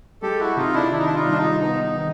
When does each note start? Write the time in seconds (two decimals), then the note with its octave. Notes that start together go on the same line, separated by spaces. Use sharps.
0.22 G#3 G4 A4
0.40 E4 F#4
0.57 C3 D#4 F4
0.74 D4 E4
0.91 D#3 E4
0.99 D#4
1.06 D4 E4
1.14 D#4 F4
1.26 C2
1.32 D4
1.37 D#4
1.61 B3 D#4
1.84 D#4
1.95 D#3